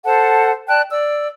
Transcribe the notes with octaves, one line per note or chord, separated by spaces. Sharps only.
A4 C5 F#5 A5
D5 G5 A5 F#6
D5 E6